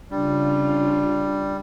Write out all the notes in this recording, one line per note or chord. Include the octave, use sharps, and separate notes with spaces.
C#3 G3 D4 F4